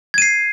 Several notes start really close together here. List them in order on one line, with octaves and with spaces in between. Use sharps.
G#6 D#7 C7